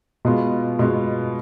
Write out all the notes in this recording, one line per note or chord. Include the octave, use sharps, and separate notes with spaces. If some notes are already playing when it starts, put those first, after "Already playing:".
B2 G#3 B3 F4
B2 G#3 B3 F4